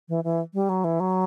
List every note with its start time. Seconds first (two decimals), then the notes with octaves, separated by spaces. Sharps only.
0.09 E3
0.24 E3
0.54 G3
0.69 F#3
0.84 E3
1.00 F#3